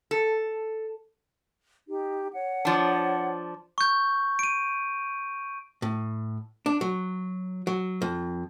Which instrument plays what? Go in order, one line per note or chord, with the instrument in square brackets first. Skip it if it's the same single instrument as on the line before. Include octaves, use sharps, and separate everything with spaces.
[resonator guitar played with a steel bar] A4
[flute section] D#4 G4
C#5 F#5
[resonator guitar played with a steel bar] F3 D4
[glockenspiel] C#6 G6
D7 D#7
[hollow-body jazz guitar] A2
D4
F#3
F#3
F2